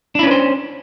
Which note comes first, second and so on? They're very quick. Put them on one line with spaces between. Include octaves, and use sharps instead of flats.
D4 E4 C#4 B4 C5